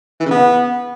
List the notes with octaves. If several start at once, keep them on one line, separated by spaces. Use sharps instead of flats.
E3
C#3
B3